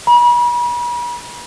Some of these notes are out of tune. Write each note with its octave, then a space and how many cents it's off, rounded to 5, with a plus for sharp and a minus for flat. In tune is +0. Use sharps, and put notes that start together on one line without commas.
B5 -40